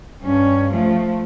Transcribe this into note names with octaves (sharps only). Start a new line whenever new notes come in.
G2 C#4
F3 A3